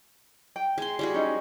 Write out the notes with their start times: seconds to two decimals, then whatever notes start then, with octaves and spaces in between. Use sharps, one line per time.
0.56 G5
0.78 G#3 C6
0.99 G3 G#3 F#4
1.14 C#4 D#4